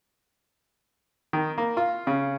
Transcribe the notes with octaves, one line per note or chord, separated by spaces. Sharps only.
D#3
A#3
F4
C#3